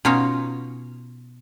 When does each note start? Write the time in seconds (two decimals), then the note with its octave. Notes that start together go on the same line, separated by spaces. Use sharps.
0.05 B2 C#4 D#4 F4 C#5